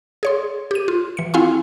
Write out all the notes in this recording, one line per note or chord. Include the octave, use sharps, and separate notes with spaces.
G#4 C#5 C6
G4 D#7
F4
E3 C#7
C4 E4 F4 F5 G#5 C6